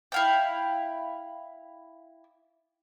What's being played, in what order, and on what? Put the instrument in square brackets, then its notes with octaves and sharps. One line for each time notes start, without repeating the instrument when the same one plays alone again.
[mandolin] E4 F5 G5